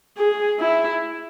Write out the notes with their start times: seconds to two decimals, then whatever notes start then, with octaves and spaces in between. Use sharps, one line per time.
0.17 G#4
0.59 E4